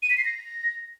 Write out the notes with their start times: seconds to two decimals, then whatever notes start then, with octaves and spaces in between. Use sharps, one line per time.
0.02 D#7
0.10 B6
0.17 C7
0.25 A#6